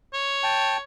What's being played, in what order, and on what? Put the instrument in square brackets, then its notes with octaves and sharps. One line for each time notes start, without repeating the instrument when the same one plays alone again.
[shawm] C#5
[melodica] G5 A5